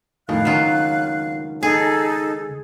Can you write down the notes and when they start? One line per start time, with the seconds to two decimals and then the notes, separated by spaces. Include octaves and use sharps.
0.29 F2 A2 D#3 F5 F#6
0.45 C#2 D#3 F#3 F4
1.63 D#4 G#4 A4 A5